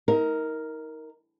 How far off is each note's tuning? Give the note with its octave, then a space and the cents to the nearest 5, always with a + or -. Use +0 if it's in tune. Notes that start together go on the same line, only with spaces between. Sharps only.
D#4 +35 A#4 +0